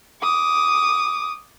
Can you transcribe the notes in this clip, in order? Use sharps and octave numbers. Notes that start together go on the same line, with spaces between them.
D6 D#6